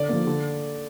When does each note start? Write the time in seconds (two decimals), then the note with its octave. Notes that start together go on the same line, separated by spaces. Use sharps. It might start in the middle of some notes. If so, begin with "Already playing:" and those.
Already playing: D3 D5
0.09 F3 A#3
0.27 D3